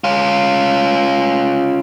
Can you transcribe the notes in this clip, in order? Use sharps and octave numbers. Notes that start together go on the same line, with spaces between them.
C#4 F4